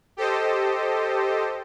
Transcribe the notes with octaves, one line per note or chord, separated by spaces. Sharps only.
G4 A4 C5 D#5